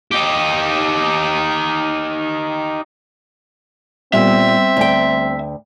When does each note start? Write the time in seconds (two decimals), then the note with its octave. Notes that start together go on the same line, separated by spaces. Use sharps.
0.11 D#4 G4
4.13 A#2 G3 B3 C4 F4 E5
4.77 D2 G5